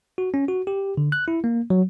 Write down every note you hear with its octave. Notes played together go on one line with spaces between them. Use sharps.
F#4
C#4
F#4
G4
D3
F#6
E4
A#3
F#3